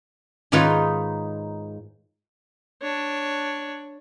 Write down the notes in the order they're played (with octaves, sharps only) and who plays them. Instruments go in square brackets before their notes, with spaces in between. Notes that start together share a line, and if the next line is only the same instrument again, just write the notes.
[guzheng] G#2 D#3 D#4 F4 B4 C#5
[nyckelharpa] D4 C#5